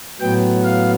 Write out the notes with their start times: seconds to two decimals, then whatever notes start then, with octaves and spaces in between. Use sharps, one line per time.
0.20 A2 F#3 B3 G5
0.64 F5